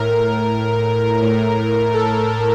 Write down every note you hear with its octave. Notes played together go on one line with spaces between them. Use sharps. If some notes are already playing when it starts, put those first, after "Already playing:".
Already playing: A2 A#4
A2
A4